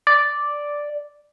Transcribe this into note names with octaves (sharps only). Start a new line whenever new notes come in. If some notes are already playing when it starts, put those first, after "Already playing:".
D5